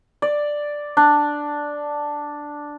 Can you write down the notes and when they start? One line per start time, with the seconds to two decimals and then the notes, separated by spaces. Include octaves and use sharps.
0.22 D5
0.97 D4